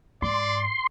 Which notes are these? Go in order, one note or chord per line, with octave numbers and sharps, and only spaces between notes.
G#2 D5 C6